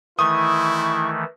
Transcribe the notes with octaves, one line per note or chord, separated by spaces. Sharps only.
D#3 E3 A3 E4 C#6 D#6